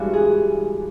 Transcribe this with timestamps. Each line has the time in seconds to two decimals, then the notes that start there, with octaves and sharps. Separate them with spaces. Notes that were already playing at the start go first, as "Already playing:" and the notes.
Already playing: G2 E3 G#3 F#4
0.13 G#4